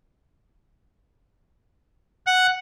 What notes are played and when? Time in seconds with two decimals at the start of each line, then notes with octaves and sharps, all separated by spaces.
2.26 F#5